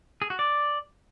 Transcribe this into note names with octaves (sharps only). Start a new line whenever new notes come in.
G#4
F#4
D5